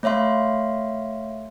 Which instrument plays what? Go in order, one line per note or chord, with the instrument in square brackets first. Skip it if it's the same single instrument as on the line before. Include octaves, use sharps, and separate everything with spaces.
[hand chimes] A3 C#5 E5 F5 C6